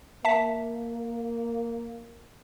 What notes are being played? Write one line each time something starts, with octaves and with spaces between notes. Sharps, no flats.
A#3 E5 A5 B6